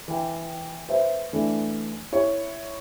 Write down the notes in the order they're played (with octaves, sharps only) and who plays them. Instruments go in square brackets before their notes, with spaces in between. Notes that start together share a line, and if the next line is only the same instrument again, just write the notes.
[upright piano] E3 G5
B4 C5 E5
E3 A3 D4
E4 C#5